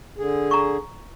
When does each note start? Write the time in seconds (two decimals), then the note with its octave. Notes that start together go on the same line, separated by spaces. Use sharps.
0.18 D3 G#4
0.51 A#5 C#6